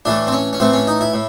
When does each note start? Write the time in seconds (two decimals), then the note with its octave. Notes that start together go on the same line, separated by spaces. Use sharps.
0.05 A2 E3 A3 D4
0.27 C4
0.32 C#4
0.53 C#4
0.60 A2 E3 A3 C4
0.73 C#4
0.87 D#4
1.01 E4
1.13 A2